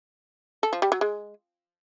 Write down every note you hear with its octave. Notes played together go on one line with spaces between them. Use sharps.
A4
F3
G3
F#3
G#3